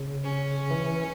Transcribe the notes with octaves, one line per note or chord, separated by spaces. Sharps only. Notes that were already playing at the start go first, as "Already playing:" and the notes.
Already playing: C#3
C#4
E3